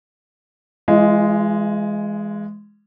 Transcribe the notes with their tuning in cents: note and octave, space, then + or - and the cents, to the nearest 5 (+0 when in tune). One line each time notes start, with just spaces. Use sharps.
E3 +25 G#3 +0 F4 -25